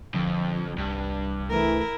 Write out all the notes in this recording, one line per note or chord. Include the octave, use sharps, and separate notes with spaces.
F2 D3 F3
C2 G2 D4
E3 A3 E4 A#4